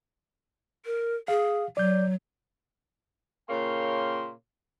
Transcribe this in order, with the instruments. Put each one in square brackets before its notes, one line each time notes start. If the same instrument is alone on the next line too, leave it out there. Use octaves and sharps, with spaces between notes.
[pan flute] A#4
[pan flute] G#4 [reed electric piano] F5
[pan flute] F#3 [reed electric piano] D5 G6
[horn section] A#2 C#3 A#3 C#5 G5 C6